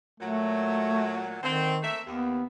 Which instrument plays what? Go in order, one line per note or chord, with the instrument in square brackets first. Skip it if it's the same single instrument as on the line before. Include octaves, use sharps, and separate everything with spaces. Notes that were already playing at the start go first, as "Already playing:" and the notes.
[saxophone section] A#2 F#3 [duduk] A3
[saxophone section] D3 C4 [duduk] D#3
[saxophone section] A3 A#3 E5
[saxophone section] D#2 [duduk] B3